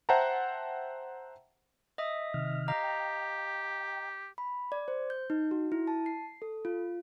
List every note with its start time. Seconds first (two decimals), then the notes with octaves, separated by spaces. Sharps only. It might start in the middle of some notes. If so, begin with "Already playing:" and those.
0.09 C5 E5 F#5 G5 A5 A#5
1.98 D#5 E5 D#6
2.34 C3 D#3 F6
2.68 G4 D#5 F5 A#5
2.83 G5
4.38 B5
4.72 D5
4.88 C5
5.10 G6
5.30 D#4
5.51 F#4
5.72 E4
5.87 A5
6.06 C7
6.42 A4
6.65 F4